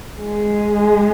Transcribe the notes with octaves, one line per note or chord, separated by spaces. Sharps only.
G#3